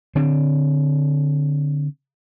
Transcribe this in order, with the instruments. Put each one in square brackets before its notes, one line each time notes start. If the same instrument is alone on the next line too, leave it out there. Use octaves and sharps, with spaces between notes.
[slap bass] D3 C4